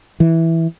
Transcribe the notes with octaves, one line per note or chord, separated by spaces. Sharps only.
E3